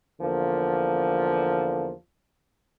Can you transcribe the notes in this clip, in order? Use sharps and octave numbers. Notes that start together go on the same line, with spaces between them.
E2 D3 F3 A#3